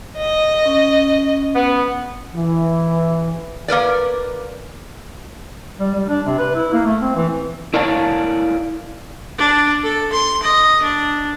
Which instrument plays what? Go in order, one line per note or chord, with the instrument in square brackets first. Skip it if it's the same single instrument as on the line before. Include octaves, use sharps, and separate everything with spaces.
[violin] D#5
[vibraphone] C#4
[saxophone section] B3
[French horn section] E3
[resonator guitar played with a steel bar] A#3 A#4 B4 D5
[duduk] G3
G3
D4
C3
B4
E4
A#3
A3
C4
E3
[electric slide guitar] E4 A#4 C#5 D5 F5 A5
[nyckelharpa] D4
A4
C6
D#5
D4